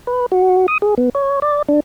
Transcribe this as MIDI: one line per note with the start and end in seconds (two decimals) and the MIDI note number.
0.07 0.26 71
0.32 0.66 66
0.68 0.78 87
0.82 0.95 68
0.98 1.10 59
1.15 1.40 73
1.42 1.62 74
1.69 1.80 62